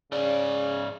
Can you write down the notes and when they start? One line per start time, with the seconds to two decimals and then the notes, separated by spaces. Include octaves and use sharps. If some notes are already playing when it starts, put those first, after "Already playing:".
0.12 G#2 C#3 D5